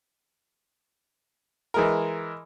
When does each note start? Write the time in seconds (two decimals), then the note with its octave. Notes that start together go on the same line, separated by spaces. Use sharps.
1.74 E3 G#3 A#4